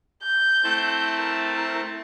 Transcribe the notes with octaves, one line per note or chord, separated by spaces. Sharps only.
G6
A3 C4 E4 A5
A#4